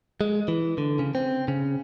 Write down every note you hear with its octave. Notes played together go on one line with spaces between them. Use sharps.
G#3
E3
D3
C#3
C4
C#3